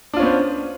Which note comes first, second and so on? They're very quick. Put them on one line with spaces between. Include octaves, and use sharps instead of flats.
D4 F4 C#4 B3 C5